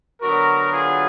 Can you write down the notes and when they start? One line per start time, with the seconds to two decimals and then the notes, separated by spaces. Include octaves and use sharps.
0.21 D3 F#3 B3 F#4 A#4
0.73 F4 G#4